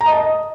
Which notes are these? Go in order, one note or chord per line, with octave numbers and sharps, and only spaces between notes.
A#5
D#5
A5
D#5